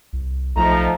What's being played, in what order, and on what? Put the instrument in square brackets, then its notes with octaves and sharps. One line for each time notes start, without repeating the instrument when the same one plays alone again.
[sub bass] C2
[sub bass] B1 [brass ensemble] F3 A3 D#4 [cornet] A#5